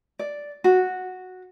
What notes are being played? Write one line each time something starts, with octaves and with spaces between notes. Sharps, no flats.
D5
F#4